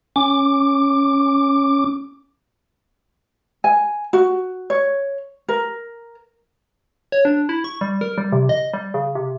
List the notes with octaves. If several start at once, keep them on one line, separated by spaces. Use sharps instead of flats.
C#4 D6
G#5
F#4
C#5
A#4
C#5
D4
E4
C#6
G3
A#4
G3
C3
D#5
G3
C#3
C3